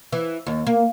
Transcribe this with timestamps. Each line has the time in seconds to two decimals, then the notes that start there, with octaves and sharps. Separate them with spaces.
0.13 E3
0.47 D#2
0.67 A#3